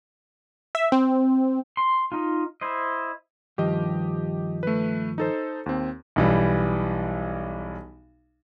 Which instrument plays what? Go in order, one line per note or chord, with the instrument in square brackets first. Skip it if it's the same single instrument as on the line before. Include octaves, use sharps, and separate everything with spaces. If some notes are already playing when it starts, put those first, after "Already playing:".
[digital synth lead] E5
C4
[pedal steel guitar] C6
D#4 F4
E4 C5 D#5
[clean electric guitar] G2 D#3 F3 [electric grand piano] G4 D#5
[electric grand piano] A3 B4
D#4 A4 C5
D#2 C4
[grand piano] B1 E3 G3